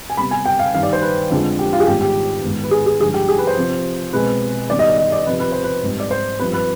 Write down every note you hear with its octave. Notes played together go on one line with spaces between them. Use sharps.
G#5
C3 G3 B3 B5
G#5
G5
F5
G2 D#3 G3 F5
D5
C5
B4
F2 D3 F3 G#3
G4
F4
G#4
G#2 D#3 G3 B3 G4
G4
G#2 D#3 B3
B4
G#4
G#4
G2 D3 F3 G#3 G#4
G4
G#4
B4
C5
C3 F3 C4
B2 G#3 C4 B4
G2 D#3 G3 B3 D5
D#5
D5
D#5
D5
C3 F3 C4 B4
B4
C5
B4
G#2 G3 C4
D5
C5
G2 F3 C4 B4
B4